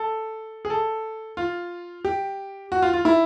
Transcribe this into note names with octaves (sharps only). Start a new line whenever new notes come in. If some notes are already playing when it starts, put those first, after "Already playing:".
Already playing: A4
G#4
A4
F4
G4
F#4
F4
F4
E4